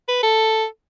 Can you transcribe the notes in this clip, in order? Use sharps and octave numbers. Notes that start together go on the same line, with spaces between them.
B4
A4